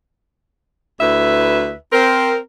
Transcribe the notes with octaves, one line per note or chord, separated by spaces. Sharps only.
D2 E4 B4 E5
C4 A#4